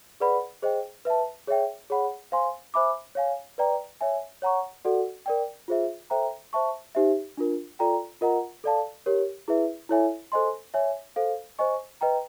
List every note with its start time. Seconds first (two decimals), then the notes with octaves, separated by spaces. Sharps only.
0.20 G#4 B4 D5 F#5 B5
0.62 G#4 C5 D#5 G5
1.05 B4 E5 A5
1.48 G#4 C#5 E5 G5
1.90 G#4 C#5 F#5 B5
2.32 C5 F5 G#5 C6
2.74 C5 E5 G#5 B5 D6
3.15 C#5 F5 G#5
3.58 B4 D5 G5 A#5
4.01 C#5 E5 G#5
4.42 C#5 F#5 A#5 C#6
4.85 F#4 A4 D5 F#5
5.26 A#4 D5 G5
5.68 F4 G#4 C5 E5
6.10 A4 C5 E5 G5 A#5
6.53 C5 E5 A5 C#6
6.95 D#4 G4 C5 E5
7.37 D4 F4 A#4
7.79 F4 A4 D5 G5 A#5
8.21 F4 A#4 D#5 F#5 A#5
8.64 A4 D5 F5 A5
9.06 G4 A#4 C#5
9.48 E4 G#4 B4 E5
9.89 E4 A4 C#5 E5 G#5
10.32 A4 C5 D#5 G#5 C6
10.74 C#5 E5 G#5
11.16 A4 C5 F5
11.59 C5 D#5 G#5 C#6
12.01 B4 D#5 G5 A#5